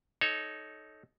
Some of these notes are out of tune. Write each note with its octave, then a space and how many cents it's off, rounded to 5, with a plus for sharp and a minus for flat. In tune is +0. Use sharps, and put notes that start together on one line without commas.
D#4 +0 A4 -20 C#5 +0